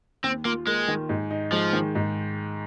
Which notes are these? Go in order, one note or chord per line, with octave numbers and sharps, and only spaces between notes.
D#2 C4
A#3 F4
G#3 A#3
D#3
G#2
D#4
F3 G#3
D#3
G#2